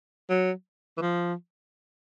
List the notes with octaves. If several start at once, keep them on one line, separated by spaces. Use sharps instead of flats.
F#3
E3
F3